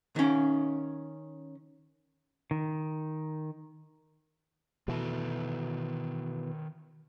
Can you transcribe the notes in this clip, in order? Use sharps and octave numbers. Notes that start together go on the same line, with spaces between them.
D#3 C#4
D#3
B2 D#3 E3 F#4 A4